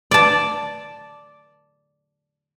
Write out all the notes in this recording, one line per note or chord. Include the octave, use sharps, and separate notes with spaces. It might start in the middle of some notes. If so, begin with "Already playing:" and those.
D5 A5